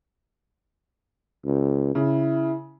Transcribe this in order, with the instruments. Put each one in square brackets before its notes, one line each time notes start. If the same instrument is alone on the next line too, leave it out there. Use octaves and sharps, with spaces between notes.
[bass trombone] C#2
[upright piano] C#3 [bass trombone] E4